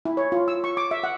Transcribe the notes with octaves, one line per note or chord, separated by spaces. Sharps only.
E4
C#5
F4
E6
C#6
D6
E5
F#5